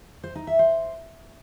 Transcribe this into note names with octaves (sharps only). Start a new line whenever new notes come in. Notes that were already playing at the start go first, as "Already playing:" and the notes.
C5
D#4
E5
C5